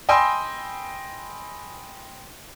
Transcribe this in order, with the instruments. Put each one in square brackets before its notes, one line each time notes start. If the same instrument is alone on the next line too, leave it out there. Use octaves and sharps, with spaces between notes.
[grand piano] D#5 G5 G#5 B5 C6 E6